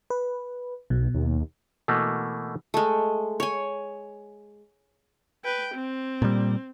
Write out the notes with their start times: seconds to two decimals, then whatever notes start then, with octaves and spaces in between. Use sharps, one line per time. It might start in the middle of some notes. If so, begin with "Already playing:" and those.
0.10 B4
0.90 B1 B2
1.14 D#2
1.88 B2 E3 A3 A#3
2.74 G#3 A3
3.40 C#5 G#5
5.44 B4 G5
5.74 C4
6.22 A#2 G3